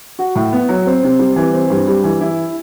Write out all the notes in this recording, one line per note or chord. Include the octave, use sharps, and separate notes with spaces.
F#4
A2
B3
F#3
C4
C3
G3
E3
C4
G2
G3
E3
E4